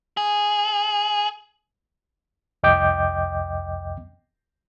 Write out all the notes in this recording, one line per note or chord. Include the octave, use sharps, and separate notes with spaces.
G#4
C2 F2 D#5 G5 D6 G6